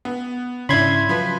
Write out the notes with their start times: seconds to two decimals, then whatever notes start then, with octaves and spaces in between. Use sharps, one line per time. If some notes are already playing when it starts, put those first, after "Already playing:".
0.05 B3
0.69 G#2 C#3 C#4 D4 E4 B5 C6 G#6
1.09 F3 F#3 B4 B6